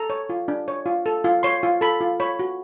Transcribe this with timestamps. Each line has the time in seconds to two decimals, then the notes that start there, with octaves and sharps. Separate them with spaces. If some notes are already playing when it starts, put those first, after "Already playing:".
Already playing: A4 A#5
0.10 C#5
0.30 F4
0.48 D4
0.68 C#5
0.86 F4
1.06 A4
1.24 F4
1.43 C#5 C6
1.63 F4
1.81 A4 B5
2.01 F4
2.20 C#5 B5
2.39 F#4